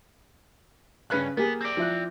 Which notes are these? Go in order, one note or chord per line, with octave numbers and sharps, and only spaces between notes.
G2 C#3 C#4 B4 F#6
A#3 B3 G4 G#4
C4 D5
F3 E4 F#6